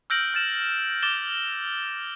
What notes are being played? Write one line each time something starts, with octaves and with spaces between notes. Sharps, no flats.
E6 F6 G6 A#6 D7 F#7
F6 A6 E7
D6 A6 E7 G7